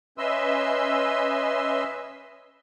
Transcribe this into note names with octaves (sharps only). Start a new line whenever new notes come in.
C#4 B4 D#5 E5 C6 E6